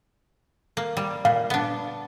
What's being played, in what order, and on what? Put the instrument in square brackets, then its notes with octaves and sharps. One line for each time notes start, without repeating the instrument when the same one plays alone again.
[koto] A#3
G3
[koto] A#2 [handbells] F5
[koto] B3 D4